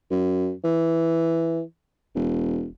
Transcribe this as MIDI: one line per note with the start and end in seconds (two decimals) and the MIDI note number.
0.11 0.52 42
0.64 1.62 52
2.15 2.67 28